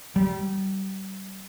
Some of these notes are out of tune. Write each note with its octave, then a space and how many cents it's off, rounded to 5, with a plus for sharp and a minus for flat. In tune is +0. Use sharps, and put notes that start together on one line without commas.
G3 -30